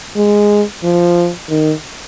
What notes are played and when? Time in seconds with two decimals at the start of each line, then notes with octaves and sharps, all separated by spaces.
0.16 G#3
0.84 F3
1.50 D#3